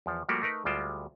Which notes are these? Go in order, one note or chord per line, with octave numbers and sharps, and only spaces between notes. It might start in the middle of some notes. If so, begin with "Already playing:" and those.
E2 F3
F3 G3 A3 A#3 F#4 G4
A3 D#4 A#4 B4
D2 G3 G#3 F4 G5 A5